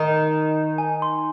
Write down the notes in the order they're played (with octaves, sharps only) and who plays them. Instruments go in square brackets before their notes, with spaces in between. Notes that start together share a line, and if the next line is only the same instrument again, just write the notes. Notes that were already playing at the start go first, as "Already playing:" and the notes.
Already playing: [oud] D#3 [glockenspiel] A#5
[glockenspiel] G#5
C6